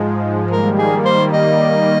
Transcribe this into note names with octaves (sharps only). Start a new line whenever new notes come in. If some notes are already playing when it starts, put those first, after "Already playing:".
Already playing: G#2 F3 G#3
D#3 G3 A#3 A#4
G#4
C5
D#5